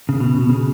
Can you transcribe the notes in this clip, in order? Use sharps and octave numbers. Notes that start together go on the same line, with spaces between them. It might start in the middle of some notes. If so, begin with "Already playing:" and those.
C#3
B2
B2
C#3